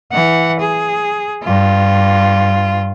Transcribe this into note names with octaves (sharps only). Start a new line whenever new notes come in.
E3 F#5
G#4
G2 F4